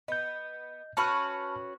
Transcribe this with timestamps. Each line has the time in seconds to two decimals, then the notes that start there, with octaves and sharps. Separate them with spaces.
0.08 B3 D#5 G6
0.97 C#4 F#4 B4 A5 B5 F6